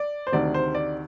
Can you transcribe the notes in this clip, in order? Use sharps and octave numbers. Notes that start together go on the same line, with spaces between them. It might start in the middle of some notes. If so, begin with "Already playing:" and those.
Already playing: D5
C5
D2 C3 D#3 D5
C5
D5